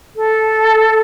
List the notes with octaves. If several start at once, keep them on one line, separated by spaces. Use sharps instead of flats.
A4